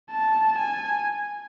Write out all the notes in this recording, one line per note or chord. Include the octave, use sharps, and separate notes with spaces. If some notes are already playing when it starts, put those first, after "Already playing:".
A5
G#5